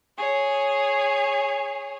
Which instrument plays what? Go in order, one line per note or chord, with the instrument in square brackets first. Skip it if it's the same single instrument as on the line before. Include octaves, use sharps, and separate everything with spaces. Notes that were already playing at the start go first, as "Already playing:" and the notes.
[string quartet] G#4 C#5